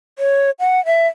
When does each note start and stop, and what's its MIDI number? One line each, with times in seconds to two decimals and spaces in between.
0.19 0.51 73
0.59 0.84 78
0.86 1.07 76